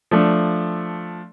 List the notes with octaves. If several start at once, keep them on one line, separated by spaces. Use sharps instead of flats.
F3 A3 D4